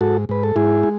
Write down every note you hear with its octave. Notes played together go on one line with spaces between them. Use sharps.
G#2 F#4 A4
G#2 B4
A4
G#2 E4 G#4
G#3